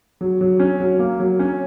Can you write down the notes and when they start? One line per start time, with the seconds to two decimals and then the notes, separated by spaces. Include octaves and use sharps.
0.21 F#3
0.41 F#3
0.60 C#4
0.80 F#3
0.99 A#3
1.20 F#3
1.39 C#4